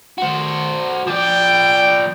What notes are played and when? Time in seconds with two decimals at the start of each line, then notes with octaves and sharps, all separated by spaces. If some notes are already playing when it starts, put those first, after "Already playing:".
0.18 F#4 C5
1.08 F3 D5 G5